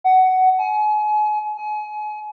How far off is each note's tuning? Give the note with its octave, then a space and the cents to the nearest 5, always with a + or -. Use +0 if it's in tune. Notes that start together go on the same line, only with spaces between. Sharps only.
F#5 +15
G#5 +35
G#5 +35